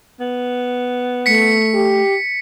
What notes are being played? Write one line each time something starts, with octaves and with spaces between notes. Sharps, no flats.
B3
A3 B6 C#7
G4